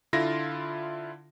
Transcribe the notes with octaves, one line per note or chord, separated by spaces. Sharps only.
D3 E4 F4 A#6